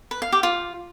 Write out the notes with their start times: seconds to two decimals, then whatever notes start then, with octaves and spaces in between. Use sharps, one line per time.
0.11 B4
0.22 F5
0.32 G4
0.43 F4